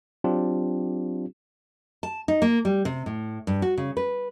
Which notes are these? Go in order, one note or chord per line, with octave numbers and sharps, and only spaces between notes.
F#3 C4 D4 F4 G4
A5
D#4
A#3
G3
C3
A2
G2
F#4
C#3
B4